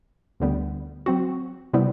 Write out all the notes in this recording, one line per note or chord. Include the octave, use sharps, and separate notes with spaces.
D2 D3 G3 B3
F#3 C4 F#4
C3 G3 B3 E4